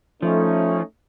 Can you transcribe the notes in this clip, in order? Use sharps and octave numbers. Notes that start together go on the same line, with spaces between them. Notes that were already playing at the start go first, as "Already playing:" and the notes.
F3 A3 C#4 D#4